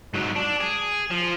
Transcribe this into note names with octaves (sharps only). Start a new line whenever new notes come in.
G#2 F#3
D4
G#4
F3